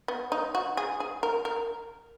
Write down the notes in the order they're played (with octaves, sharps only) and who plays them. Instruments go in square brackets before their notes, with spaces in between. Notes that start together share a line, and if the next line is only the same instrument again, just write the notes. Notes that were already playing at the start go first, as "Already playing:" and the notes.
[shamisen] B3
D#4
F#4
G#4
G#4
A#4
A#4